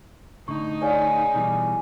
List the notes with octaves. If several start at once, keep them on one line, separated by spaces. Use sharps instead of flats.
A2 D3 D#4 C#6
C#4 G#4 D5 F5 G#5
B2 E3 G3